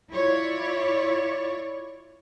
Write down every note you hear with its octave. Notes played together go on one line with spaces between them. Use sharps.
E4 F4 C#5 D5